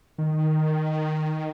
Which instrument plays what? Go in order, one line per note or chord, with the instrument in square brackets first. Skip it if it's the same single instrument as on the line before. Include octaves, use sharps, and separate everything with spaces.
[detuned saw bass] D#3